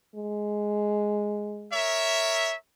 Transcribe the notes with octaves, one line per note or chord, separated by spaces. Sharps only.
G#3
A#4 C#5 E5